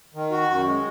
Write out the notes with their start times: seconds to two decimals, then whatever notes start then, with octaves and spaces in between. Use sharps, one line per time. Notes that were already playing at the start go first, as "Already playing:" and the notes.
0.14 D#3
0.31 F#4
0.49 F#2
0.66 G#3